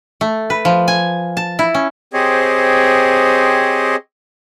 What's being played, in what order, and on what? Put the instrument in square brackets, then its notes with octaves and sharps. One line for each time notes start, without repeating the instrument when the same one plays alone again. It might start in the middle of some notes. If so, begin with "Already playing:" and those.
[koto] A3
B4
F3
G#5
A5
E4
C#4
[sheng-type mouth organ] C4 G4 G#4 C5 C#5 D#5